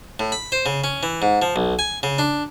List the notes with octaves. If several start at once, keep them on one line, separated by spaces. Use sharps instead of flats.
A2
B5
C5
C#3
C#4
E3
G#2
F3
B1
G#5
C#3
D4